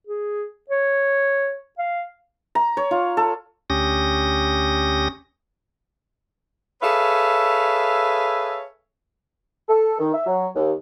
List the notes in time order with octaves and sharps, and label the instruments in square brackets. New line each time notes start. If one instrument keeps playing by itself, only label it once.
[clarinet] G#4
C#5
F5
[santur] A#5
C#5
F4
A4
[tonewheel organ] D2 C#4 G4 D#6 A#6
[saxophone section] G#4 A4 B4 C#5 E5 F5
[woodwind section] A4
D#3
E5
F#3
D#2